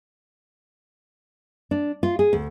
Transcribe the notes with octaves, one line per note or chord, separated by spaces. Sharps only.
D4
F4
G#4
D2